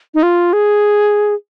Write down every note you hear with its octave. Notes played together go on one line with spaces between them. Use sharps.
D#4
F4
G#4